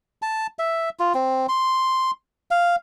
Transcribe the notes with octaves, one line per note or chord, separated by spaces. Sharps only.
A5
E5
F4
C4
C6
F5